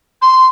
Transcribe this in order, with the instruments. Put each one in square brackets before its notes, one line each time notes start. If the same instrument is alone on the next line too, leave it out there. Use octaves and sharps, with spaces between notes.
[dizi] C6